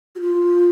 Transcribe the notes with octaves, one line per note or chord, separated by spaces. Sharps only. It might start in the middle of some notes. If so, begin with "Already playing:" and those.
F#4
F4